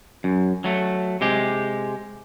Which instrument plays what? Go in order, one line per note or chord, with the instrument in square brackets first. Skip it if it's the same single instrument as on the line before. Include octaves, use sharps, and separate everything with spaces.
[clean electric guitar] F#2
F#3 A3
C3 G#3 G4